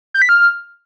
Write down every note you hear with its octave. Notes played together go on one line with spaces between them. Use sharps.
G6
B6
F6